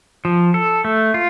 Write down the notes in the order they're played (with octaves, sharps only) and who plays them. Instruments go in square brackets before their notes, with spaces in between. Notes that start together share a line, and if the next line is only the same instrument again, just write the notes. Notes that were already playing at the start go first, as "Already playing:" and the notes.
[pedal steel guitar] F3
A4
A3
F4